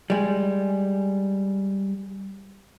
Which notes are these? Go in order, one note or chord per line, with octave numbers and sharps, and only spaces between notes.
G3 G#3